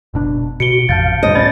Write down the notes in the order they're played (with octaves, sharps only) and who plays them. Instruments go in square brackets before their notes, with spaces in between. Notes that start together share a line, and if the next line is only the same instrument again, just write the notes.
[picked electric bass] F#1 B2 D4
[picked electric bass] B2 [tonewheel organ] F#4 [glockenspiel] C#7 D7 G7
[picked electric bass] A1 F2 C3 [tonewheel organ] F5 [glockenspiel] A5 G6 A6
[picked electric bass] D2 G2 [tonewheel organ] C5 [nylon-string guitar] D#5
[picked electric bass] A2 B3 C#4 [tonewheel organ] D5 A6 [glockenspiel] B5 G6